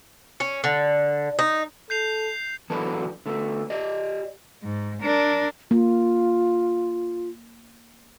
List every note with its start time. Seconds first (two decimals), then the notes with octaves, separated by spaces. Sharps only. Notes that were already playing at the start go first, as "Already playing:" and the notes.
0.40 C#4
0.64 D3
1.39 D#4
1.90 A4 G6 C7 F7
2.70 E3 F#3 B3 D4 F#4 A4
3.26 D3 A3 B3
3.70 G4 D5 D#5
4.63 G#2
5.03 D4 A#4
5.71 A#3 F4